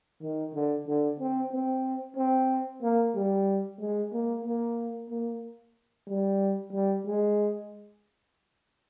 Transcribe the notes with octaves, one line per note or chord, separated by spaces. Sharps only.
D#3
D3
D3
C4
C4
C4
A#3
G3
G#3
A#3
A#3
A#3
G3
G3
G#3